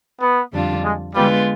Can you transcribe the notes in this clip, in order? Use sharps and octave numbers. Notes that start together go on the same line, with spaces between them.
B3
F2 D3 G3 D4 F4
G#3
D3 G3 G#3 B3 F4 B4